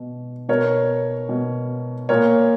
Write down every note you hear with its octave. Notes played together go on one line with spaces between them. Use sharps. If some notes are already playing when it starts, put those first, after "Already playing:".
Already playing: B2
B2 A#4 C#5
B2
A#2 A#4 C#5